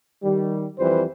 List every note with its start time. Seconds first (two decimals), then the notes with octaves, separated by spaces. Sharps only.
0.22 D#3 G3
0.78 F2 E3 G3 B4 C5